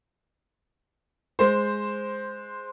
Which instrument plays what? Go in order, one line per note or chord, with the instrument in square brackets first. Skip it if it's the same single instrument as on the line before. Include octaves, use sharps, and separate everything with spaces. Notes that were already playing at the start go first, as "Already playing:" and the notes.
[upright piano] G#3 C5